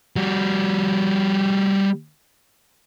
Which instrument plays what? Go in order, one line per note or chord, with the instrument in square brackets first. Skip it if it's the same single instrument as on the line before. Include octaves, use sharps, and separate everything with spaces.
[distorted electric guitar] G3 F#4